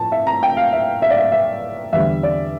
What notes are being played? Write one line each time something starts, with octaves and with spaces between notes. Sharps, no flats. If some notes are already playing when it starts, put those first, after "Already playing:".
Already playing: A2 F3 A5
E5
A#5
G5
F5
E5
E5
D5
E5
E5
E2 D3 G3 E5
D5